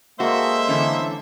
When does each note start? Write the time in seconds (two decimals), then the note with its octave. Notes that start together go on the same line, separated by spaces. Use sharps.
0.20 G#3 A#3 F#4 A4 C5 E5
0.68 D3 E3 C#4